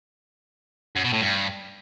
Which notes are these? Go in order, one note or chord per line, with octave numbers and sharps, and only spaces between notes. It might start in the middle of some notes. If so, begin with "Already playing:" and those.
F#2
B2
A2
G2